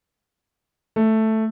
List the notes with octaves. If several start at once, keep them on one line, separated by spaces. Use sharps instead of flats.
A3